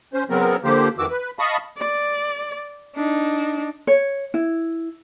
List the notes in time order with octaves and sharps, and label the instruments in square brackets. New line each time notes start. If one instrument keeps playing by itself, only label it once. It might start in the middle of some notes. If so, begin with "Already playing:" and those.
[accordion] C#4 C5
C#3 F#3 B3 C4 A#4
D3 F3 A#3 G4 C5
F2 D#3 E3 F#4 D6 E6
B4
D#5 F5 A5 B5 C#6 D#6
[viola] D5
D4 D#4
[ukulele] C#5
E4